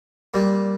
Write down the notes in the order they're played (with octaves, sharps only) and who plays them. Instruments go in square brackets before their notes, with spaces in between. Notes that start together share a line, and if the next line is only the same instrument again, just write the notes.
[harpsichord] A#2 G3